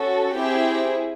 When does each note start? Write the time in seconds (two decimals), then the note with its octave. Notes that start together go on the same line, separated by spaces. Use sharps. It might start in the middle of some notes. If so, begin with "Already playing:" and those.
Already playing: C#4 F#4 A4
0.35 C4 E4 G4 G#4 G5